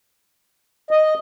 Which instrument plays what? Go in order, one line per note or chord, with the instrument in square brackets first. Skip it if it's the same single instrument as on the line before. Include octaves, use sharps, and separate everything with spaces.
[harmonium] D#5